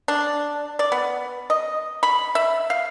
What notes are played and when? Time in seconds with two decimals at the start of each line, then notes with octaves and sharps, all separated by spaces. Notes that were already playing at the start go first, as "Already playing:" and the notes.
0.08 D4
0.79 D5
0.92 B3
1.50 D#5
2.03 B5
2.35 E5
2.70 F5